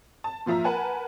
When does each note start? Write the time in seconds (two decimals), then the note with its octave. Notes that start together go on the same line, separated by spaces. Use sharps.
0.24 A5
0.46 A#2 F3 F4 E5 A#5
0.64 A#4 B4 F#5 G#5 A5